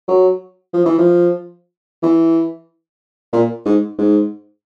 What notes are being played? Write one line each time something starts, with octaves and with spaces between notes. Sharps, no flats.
F#3
F3
E3
F3
E3
A#2
G#2
G#2